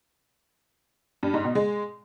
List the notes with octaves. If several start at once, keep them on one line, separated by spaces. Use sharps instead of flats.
G2
G#2
B2
G#3